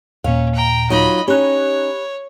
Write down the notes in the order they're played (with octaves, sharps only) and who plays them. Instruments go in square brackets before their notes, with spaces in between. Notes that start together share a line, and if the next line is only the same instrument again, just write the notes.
[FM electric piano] D#2 A#2 [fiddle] C#4 [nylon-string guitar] F5
[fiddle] G5 A#5
[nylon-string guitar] F#3 D#4 F4 [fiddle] D#5 B5
[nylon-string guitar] C#4 D#4 [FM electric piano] G4 B5 F#6 [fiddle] C#5